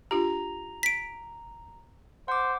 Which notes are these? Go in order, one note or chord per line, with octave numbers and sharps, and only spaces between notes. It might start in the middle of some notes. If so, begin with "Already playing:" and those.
D4 F4 G4 A#5
B6 D7
C5 F#5 D6